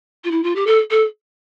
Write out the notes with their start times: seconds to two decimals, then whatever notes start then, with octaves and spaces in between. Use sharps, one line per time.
0.24 F4
0.31 E4
0.43 F4
0.55 G4
0.67 A4
0.91 A4